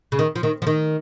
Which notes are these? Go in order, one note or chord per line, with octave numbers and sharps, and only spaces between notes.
C#3
D#3
F3
D#3
F3
D#3